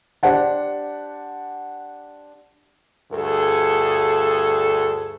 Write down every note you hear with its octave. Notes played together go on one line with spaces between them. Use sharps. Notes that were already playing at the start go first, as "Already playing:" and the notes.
D4 G4 C5 F#5 A5
D2 G2 G#4 A4